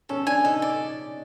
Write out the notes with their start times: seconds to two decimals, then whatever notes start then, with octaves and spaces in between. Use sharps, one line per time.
0.09 C#4 A4
0.27 D4 G#5
0.45 D#4 A4
0.62 D5